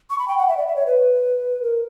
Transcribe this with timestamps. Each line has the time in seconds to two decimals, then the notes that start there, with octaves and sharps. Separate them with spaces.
0.10 C#6
0.19 B5
0.28 G5
0.38 F#5
0.48 E5
0.57 D5
0.67 E5
0.76 C#5
0.87 B4
1.62 A#4